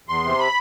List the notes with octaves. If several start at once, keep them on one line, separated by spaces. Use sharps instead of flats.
E2 C6
C3
B5